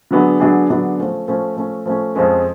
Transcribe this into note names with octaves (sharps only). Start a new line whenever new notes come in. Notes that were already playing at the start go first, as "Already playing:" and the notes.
D3 F#3 B3 D4 G#4
D3 F#3 B3 D4 G#4
D3 F#3 B3 D4 G#4
F3 A3 C#4
F3 A3 C#4
F3 A3 C#4
F3 A3 C#4
F2 F3 G#3 C#4